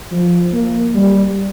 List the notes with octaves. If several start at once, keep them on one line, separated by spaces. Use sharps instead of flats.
F3
A#3
G3